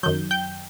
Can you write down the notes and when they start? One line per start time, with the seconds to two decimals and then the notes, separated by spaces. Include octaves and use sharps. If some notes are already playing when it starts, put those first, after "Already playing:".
0.03 F#2 D#3 F#3 G6
0.31 G5 G6